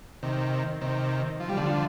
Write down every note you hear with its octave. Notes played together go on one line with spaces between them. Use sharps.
C3 D#3
C3 D#3
F3
G3
D3 F3